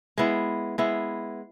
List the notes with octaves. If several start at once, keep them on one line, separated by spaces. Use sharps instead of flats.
G#3 B3 E4
G#3 B3 E4